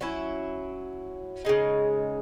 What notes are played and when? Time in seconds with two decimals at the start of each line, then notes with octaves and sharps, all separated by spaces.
0.01 F#3 C#4 E4
1.45 C#3 G#3 D#4